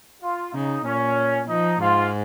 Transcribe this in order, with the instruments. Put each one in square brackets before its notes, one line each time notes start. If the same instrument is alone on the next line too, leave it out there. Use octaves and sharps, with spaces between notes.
[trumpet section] F4
[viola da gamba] C#3 [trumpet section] D#4
[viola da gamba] A#2 [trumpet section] C#4
[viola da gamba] F3 [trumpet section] D#4
[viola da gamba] G#2 [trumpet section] F4